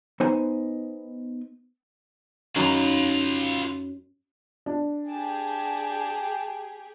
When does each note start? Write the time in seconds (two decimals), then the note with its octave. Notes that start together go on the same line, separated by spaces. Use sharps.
0.20 B3 D#4 B4 C5 D#5 G#5
2.56 F#2 D#4 F4 B4
4.66 D4
5.10 G4 G#4 A5